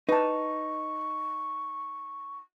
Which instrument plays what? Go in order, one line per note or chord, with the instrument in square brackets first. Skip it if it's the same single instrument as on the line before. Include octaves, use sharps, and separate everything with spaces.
[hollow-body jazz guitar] D#4 [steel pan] B4 A5 [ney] C#6